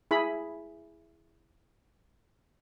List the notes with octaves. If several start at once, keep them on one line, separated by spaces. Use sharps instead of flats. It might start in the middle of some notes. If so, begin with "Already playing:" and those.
E4 G#4 B5